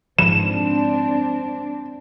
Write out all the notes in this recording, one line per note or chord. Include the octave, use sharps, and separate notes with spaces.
G#2 F3 C4 D4 E7